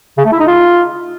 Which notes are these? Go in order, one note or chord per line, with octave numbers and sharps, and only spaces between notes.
C#3
A3
E4
D#4
F4